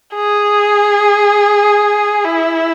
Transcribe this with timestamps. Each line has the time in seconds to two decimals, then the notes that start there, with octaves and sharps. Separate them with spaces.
0.15 G#4
2.25 E4